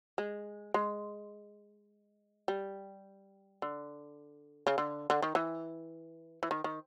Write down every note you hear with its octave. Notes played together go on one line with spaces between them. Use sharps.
G#3
G#3
G3
D3
C#3
D3
D3
D#3
E3
E3
D#3
D#3